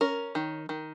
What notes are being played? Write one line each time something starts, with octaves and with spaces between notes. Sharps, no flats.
C#4 A#4
D#3
D#3